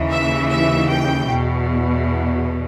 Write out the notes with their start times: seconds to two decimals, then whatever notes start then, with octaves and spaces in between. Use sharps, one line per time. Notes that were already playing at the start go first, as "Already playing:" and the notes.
Already playing: D#2 C#3 E3
0.11 E5
0.49 E5
0.89 G5
1.28 E2 B2